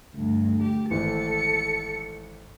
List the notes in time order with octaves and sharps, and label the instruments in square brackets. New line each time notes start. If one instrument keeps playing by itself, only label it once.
[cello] D2 G2
G4
[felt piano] G#1 E3 [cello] A4 [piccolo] C#7